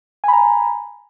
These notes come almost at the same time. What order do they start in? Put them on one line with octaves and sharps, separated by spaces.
G#5 B5 A#5